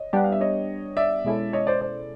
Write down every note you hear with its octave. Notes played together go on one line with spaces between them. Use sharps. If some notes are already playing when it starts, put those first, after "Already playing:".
Already playing: C#5 D#5
G3 B3 D4 G4 F#5
F5
E5
C#5 D#5
D5 E5
B2 G#3 C#4 E4 A4
C#5 D#5
C5 D5
C5 D5